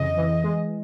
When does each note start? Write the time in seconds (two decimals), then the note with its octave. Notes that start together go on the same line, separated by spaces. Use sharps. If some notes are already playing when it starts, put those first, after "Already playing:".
Already playing: F2 C#3 E3 D#5
0.17 E3
0.44 G#3